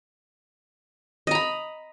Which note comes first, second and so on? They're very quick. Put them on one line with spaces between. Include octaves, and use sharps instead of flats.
D#5 A#5 B5